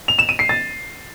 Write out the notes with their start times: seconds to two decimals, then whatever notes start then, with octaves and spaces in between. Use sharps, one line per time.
0.08 F7
0.19 E7
0.29 D#7
0.39 C7
0.49 A6